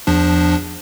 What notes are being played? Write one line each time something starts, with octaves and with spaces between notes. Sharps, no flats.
E2 F3 D4